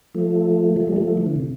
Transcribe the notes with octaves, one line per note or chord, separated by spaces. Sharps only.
F3 A3
F3 A3
G3
F3 A3
E3
D3
C3